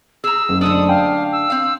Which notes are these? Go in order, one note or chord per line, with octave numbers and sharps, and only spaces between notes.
G#4 A#5 E6
F#1
D3 A3 D4 D#6
F5 G5
E6
C4 F5